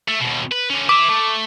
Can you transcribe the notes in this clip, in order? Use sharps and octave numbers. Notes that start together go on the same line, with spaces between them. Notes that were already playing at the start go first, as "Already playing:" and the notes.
A3
D#2 B2
B4
D3 C#4
B4 E5 D6
A3